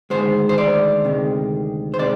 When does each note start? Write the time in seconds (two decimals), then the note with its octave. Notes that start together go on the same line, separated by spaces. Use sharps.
0.10 D2 C3 D#3 G#3 C5
0.49 C5
0.58 D5
1.04 D2 C3 D#3 G#3
1.94 C5
1.99 C3 D#3 G#3 D5